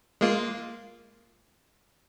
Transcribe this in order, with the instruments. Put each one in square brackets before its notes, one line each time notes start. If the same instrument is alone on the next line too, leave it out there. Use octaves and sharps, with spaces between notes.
[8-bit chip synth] G#3 A#3 F4